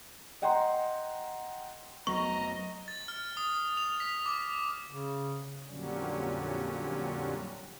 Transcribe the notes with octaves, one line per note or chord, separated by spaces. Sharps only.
D#5 F#5 G5 A#5 C6
F1 F#3 B3 D#5 A#5 C#6
A6
F6
D#6
F7
B6
D6
C#3
F2 A#2 D3 F#3 G3 C#4